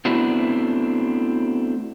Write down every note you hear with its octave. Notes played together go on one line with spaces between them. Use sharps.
A3 B3 C4 D4 E4 F#4